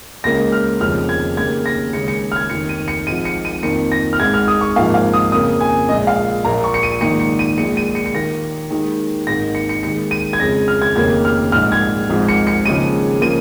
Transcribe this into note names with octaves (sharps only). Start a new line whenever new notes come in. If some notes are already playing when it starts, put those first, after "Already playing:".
C#2 C#3 A#3 A#6
F6
F1 D#2 C#3 F3 F6
G#6
D#2 C#3 A#3 G#6
A#6
D#2 C#3 G#3 C#7
C#7
F6
G#6
F1 D#2 D#3 C#7
D#7
C#7
G#1 G#2 F3 D#7
C#7
D#7
F2 D#3 A#3 C#7
A#6
F6
G#1 G#2 G#3 G#6
F6
D#6
C#6
G#1 G#2 F3 A#3 F5
F5
D#6
F2 C#3 A#3 D#6
G#5
A#1 A#2 G#3 D#5
F5
A#1 A#2 A#3 A#5
C#6
C#7
D#7
A#1 G#2 D#3 A#3 C#7
C#7
D#7
A#1 A#2 G#3 C#7
D#7
C#7
C#7
D#2 D#3 A#3 A#6
D#2 D#3 G#3
G#1 G#2 D#3 A#3 A#6
C#7
C#7
D#2 D#3 G#3 C#7
D#7
G#6
F2 C#3 G#3 A#6
F6
G#6
F1 D#2 C#3 A#3 G#6
F6
A#1 G#2 G#3 F6
G#6
G#1 G#2 F3 G#3
C#7
C#7
D#2 C#3 F3 G#3 D#7
C#3 F3 A#3 D#7